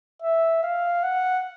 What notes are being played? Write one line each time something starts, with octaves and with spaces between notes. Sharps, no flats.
E5
F5
F#5